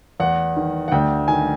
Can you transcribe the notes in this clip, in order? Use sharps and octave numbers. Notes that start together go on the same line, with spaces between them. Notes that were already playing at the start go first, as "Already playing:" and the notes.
E2 F#5
D#3
F#5
D2 G5
D#3 G#5